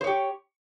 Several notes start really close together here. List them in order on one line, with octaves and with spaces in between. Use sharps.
C5 C#5 G4